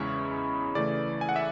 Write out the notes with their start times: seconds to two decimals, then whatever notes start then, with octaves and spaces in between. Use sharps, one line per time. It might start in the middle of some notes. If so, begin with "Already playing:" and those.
Already playing: E2 C#3 G#3 C#4 E4 B5 C#6
0.75 C#3 E3 A3 D5
1.21 G#5
1.29 F#5
1.36 E5